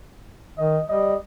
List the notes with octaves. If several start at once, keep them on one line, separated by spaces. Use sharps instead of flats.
D#3 D#5
G3 D#5